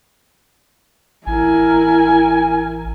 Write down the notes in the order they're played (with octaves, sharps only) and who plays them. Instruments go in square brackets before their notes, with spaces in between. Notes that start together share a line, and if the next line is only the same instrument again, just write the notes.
[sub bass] A1 [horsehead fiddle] E4 A#4 [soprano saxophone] G#5